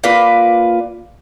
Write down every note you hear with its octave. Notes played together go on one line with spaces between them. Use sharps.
A#3 F4 B4 D5